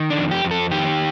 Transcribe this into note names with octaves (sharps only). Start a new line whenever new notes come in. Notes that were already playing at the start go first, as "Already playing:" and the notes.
Already playing: D#3
D4
F2
G4
F2
A4
D#3 G4